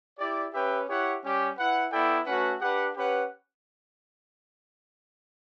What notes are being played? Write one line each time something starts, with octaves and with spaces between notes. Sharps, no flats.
E4 G4 D5
C#4 G4 B4 E5 G5
E4 G4 C#5 F#5
G3 C#4 G4
E4 B4 F#5
B3 E4 A4 D5 G5
A3 C#4 F#4 B4 F#5
D4 G4 B4 F#5
C#4 G4 B4 F#5